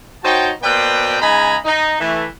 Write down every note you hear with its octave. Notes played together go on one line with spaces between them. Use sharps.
D#4 F#4 C5 C#5 G5 A5
B2 A#3 B4 C5 D5 G5
C#3 G#3 D#4 G#5 A#5 B5
D#4
E3 A3